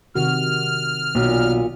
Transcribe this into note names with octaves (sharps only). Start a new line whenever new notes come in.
C3 D#3 F#4 F6
B1 A#2